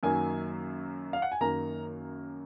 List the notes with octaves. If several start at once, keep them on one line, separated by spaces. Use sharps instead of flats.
F#2 D#3 F#3 A#3 G#5
F5
F#5
G#5
F#2 D#3 A#3 A#5